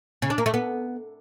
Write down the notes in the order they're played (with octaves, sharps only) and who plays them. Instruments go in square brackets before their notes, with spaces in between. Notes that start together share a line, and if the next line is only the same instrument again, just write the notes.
[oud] C#3
D4
A#3
A3
B3